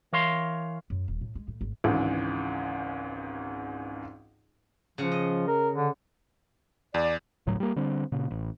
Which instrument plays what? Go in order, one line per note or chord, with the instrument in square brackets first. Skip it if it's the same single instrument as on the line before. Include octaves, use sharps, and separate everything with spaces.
[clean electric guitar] E3 A#4 C#5 F5 C6
[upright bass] F#2
D#1
A2
G#3
A2
G#1
[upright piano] G#1 C#2 G#2 E3
[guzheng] C#3 F#5 [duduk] F3
[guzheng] D#5
[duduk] A#4
D3
[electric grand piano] E2 [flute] D5
[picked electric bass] G1 D2 A2 F#3
G3 A#3
D3 G3 C4
A#2 C#3
A1